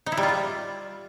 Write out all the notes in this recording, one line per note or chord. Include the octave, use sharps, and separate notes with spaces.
D#4
E4
G3
F4
G3